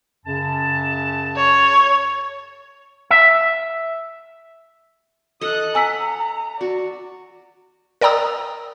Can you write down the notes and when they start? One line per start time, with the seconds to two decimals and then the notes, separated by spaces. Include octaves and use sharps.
0.25 F#2 C#3 A5
1.36 C#5
3.11 E5
5.41 A4 D#5 D#6 F#6
5.75 F#5 G#5 A#5 E6 B6
6.61 F#4 D5
8.01 A#4 D5 G5 A#5 D#6 E6